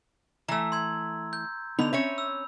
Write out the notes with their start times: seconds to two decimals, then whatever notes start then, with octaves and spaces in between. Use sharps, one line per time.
0.48 E3 A3 A#5 E6
0.72 C6 E6 G#6
1.33 G6
1.79 D3 B3 D#4 B5 F7
1.93 C4 C#4 C#5 E5
2.18 E6